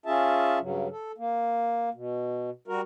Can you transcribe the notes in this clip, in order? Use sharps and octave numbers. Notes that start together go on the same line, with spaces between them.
C#4 F4 G#4 E5 A5
G2 C#3 F#3
A4
A#3
B2
G3 F#4 A#4